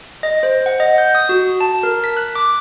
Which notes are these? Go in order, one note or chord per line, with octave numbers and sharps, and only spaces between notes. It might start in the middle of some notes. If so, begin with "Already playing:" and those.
D#5
C5
F#5
D#5
G6
D#6
F#4
A5
A#4
B6
F#6
D6